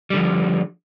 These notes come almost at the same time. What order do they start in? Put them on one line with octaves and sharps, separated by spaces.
G3 D3 F3